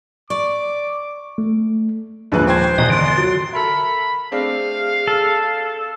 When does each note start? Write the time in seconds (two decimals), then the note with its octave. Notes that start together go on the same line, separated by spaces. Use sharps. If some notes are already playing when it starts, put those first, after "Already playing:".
0.30 D5 C#6 D6
1.38 A3
2.32 A#1 D#2 D3 G#3 B4 F#6
2.47 C5 G5 G#6
2.78 G#1 E2 B2 D#5
2.90 D3 C6
3.17 F#3
3.53 A4 A#4 E5 B5
4.32 A3 C4 D4 G#4 F5
5.08 A4